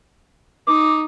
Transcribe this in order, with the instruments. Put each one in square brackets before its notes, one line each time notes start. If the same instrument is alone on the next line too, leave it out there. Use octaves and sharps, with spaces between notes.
[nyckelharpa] D#4 [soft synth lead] D6